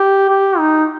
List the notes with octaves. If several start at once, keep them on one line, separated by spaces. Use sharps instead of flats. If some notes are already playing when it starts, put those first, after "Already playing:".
Already playing: G4
G4
D#4